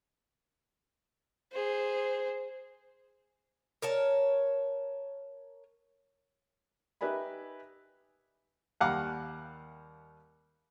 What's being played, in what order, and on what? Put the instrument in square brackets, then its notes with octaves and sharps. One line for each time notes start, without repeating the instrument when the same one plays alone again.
[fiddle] G#4 C5
[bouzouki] A#4 C#5 A5
[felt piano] D#4 G4 B4 E5 G#5 B5
[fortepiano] D#2 G3 F5 F#5 A#5 D6